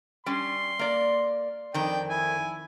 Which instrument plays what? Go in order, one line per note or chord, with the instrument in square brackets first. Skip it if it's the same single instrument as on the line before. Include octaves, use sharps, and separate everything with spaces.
[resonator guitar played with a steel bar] G3 C#4 [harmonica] C6
[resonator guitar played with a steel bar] A#3 D5
[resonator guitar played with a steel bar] F2 D#3 [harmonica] D5 G5
[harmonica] E4 G#5